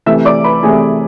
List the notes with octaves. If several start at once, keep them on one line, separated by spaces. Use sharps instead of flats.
C3 E3 A3 E5 E6
D5 D6
B4 B5
C3 E3 A3 G#4 G#5